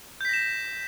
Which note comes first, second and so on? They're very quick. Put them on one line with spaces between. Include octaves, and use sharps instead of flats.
G6 B6 A#6 E7